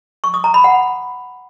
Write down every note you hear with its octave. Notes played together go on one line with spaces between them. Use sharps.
C#6
D#6
A#5
B5
F#5